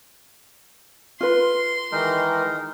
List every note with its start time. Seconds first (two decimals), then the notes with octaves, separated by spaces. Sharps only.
1.21 F4 B4 C6
1.92 D#3 E3 G#3 D#4 A#4